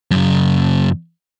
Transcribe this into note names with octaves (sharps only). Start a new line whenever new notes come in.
F#2 C#3